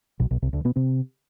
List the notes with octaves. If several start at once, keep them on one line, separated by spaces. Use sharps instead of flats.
B1 B2
B1 B2
C2 C3
D2 D3
B2 B3
C3 C4